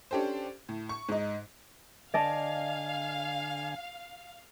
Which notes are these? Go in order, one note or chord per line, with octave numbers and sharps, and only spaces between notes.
C#4 D4 G4 A4 C5
A2
C#6
G#2 D#4
D3 D5 D#5 F5 G#5 A5